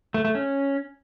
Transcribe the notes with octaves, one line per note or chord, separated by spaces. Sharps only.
A3
A3
C#4